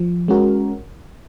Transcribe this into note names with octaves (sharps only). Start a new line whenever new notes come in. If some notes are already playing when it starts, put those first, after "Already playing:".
Already playing: F3
G#3 C#4 F#4 A#4